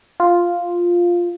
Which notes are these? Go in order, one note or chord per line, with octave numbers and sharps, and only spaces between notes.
F4